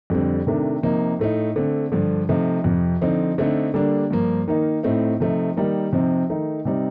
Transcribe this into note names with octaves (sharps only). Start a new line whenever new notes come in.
F2 D3 G3 C4
C3 D#3 A3 D4
C3 F3 A#3 D#4
A2 A3 D#4
D3 A3 C4
G2 D3 F3
C3 F3 A3 D#4
F2 C3 F3
D3 F3 C4 D#4
D3 A3 C4 D#4
D3 G3 A#3 D4
G2 F3 A#3
D#3 A#3 D#4
A2 A3 C4 D#4
C3 F3 A3 D#4
D#3 G3 A#3 D#4
C3 F3 C4 D#4
D#3 A3 D#4
C3 G3 C4 D#4